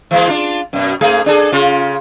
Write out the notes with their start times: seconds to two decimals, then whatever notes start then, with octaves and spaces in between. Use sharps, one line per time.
0.11 E3 G#3 A#3
0.28 D4 F4
0.73 F#2 B2
1.01 G#2 A3 G#4
1.26 D4 G#4 A4
1.53 C#3 F4